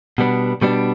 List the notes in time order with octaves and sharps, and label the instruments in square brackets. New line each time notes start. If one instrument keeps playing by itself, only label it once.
[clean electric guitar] B2 G3 B3 D4
B2 G3 B3 D4